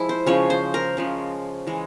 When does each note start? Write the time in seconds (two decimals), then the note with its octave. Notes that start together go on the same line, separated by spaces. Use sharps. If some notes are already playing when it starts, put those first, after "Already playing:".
Already playing: F3 G#3 E4
0.09 C5
0.26 C#3 F3 G#3 C#5
0.50 C5
0.74 A#4
0.97 C#3 F3 G#3
1.67 E3 G#3